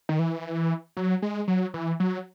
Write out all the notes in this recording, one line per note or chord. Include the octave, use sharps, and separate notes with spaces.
D#3
E3
F#3
G#3
F#3
E3
F#3